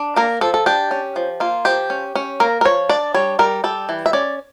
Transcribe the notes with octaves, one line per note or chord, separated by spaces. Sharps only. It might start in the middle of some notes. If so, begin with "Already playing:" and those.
Already playing: D4
A#3 A#4
F3 A4
A4
D4 G4
C#4
F3
A#3 F4
F3 G4
C#4
C#4
A#3 A#4
A#4
F3 C#5
D4 D5
G3 C#5
G3 A#4
G3 A4
E3
E5
C#4 D5